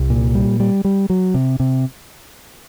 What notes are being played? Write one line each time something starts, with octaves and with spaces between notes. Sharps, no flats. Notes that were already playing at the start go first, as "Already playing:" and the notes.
Already playing: C2
A#2
G3
G3
G3
F#3
C3
C3